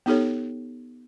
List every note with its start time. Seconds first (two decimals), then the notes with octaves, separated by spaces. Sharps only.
0.06 B3 D#4 G4 A4 C#5